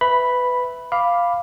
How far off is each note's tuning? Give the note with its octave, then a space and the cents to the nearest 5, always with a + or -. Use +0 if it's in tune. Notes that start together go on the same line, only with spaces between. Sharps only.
B4 +15 E5 +0 B5 +0
F5 +0 B5 +0 D6 +0